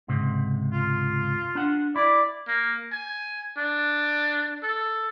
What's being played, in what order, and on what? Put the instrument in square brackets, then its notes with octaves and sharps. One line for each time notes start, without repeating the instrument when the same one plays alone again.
[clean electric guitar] C#2 G#2 C3
[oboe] F4
[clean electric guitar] D4 F#5
[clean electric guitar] E4 [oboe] D5
[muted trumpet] A#3
G#5
D4
A4